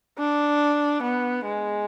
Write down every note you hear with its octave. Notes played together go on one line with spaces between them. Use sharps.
D4
B3
G#3